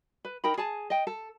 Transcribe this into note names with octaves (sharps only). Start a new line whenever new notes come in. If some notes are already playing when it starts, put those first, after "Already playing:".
B4
D#4 A#4 G5 B5
G#4 G#5 A5
D#5 G5
A4